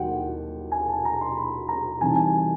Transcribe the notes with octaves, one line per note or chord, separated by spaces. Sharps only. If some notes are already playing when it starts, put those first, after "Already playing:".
Already playing: D#2 D#3 F#3 F#5 G5
G#5
A5
A#5
C6
B5
A#5
C3 E3 G3 C4 D#4 G#5
A5
G#5